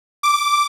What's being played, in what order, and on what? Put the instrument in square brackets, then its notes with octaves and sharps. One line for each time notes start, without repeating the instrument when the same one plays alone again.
[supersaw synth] D6